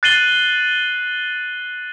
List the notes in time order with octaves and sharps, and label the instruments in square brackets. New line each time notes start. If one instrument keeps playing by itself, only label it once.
[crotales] F#6 A6 C7 D#7 F#7 G7